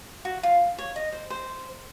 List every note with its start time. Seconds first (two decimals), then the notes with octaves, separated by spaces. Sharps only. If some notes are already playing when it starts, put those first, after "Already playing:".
0.25 F#4
0.43 F4
0.78 C#5
0.96 D#5
1.12 C5
1.30 C5